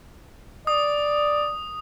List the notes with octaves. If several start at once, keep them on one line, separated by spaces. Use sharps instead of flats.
D5 D#6